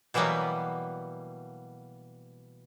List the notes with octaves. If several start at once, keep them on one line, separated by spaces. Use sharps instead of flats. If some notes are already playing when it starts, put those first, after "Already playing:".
B2 E3 F#3 G3 A#3 B3